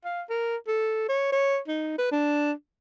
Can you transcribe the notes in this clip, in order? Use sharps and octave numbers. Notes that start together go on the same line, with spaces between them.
F5
A#4
A4
C#5
C#5
D#4
B4
D4